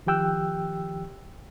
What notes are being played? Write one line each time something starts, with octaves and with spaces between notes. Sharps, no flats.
D#3 F3 G4 G5 E6 F#6